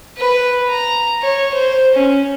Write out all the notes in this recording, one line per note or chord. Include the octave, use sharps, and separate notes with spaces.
B4
A#5
C#5
C5
C#4